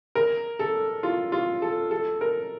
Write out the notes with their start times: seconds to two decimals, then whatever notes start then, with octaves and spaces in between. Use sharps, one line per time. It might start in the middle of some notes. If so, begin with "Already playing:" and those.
0.15 A#4
0.59 A4
1.03 F4
1.32 F4
1.62 A4
1.91 A4
2.21 A#4